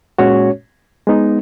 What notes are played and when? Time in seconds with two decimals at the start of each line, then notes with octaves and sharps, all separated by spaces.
0.18 A#2 G#3 C#4 F#4 C#5
1.07 G#3 B3 D#4